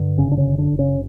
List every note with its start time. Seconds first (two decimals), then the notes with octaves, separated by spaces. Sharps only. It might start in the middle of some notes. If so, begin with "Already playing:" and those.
Already playing: G2 D3
0.18 F#1 C#3 C#4
0.32 D4
0.37 C#3 C#4
0.45 F#1
0.58 D3 D4
0.72 F#1
0.79 C#3 C#4